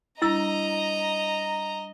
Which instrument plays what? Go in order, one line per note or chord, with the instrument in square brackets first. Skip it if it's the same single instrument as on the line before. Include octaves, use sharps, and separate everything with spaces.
[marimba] G3 D4 [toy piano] E4 E6 [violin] D#5 [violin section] A#5